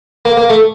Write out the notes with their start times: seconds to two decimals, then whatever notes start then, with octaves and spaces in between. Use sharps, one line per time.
0.25 A#3
0.37 A#3
0.50 A3